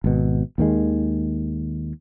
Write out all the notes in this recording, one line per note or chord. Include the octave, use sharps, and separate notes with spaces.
G#1 B2
D#2 D#3 G#3